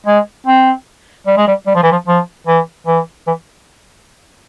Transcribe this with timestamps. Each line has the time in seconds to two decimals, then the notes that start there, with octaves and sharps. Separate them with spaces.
0.06 G#3
0.47 C4
1.27 G3
1.37 G#3
1.48 G3
1.67 G3
1.75 F3
1.83 E3
1.92 F3
2.07 F3
2.47 E3
2.87 E3
3.27 E3